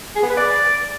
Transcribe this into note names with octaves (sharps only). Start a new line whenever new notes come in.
G#4
B3
B4
D5